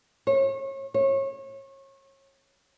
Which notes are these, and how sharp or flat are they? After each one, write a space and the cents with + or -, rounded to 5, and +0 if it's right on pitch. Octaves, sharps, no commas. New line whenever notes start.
C#5 -35
C#5 -30